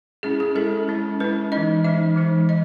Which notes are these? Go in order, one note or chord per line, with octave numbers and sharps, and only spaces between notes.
G#3 C#4 E4 G#4
G#4
G#3 C#4 E4 A4
G#3 C#4 E4
G#3 C#4 E4 B4
E3 G#3 D#4 D#5
E3 G#3 D#4 E5
E3 G#3 D#4
E3 D#5